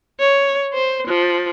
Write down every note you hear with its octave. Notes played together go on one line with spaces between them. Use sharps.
C#5
C5
F3